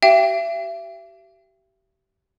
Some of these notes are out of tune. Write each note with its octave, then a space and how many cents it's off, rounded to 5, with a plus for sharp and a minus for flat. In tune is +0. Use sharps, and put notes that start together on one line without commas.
G4 -35 E5 +35 G5 +0